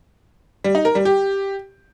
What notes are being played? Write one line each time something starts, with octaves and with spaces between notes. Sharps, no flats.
G3
D#4
A#4
G3
G4